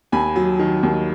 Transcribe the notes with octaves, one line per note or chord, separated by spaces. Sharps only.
D#2 G#5 B5
F#3
D#3
D#2